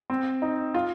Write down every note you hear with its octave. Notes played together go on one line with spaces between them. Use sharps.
C4
D#4
F4